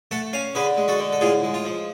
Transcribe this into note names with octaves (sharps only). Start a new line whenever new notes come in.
A3 F#5 A5
C#4 F5 G#5
D3 G#4 B4
G#3
F#4 A4
D3
A4
A2 F4 G#4
G#3
F4
F3